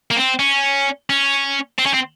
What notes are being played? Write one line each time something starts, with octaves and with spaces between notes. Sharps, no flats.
A#3
C4
C#4
C#4
C4
C#4
C4